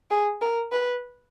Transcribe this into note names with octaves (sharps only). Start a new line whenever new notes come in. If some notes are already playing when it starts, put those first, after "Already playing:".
G#4
A#4
B4